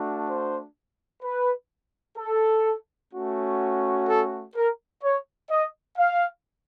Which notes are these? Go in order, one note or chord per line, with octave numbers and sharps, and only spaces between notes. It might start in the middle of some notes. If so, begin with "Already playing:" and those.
Already playing: A3 D4 F#4
C5
B4
A4
A3 C#4 F#4
A4
A#4
C#5
D#5
F5